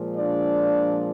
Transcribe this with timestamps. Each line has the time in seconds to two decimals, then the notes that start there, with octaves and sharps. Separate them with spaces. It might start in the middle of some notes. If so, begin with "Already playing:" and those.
Already playing: A#2 F3 G#3
0.17 D4 D5